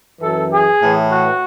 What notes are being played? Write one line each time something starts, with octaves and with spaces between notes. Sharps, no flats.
F#2 E3 A4
G#4
A2 E3
F#4